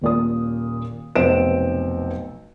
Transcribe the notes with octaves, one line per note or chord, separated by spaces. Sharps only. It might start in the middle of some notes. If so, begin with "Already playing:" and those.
D#1 A#2 D#6
F1 B1 C4 B4 D7 E7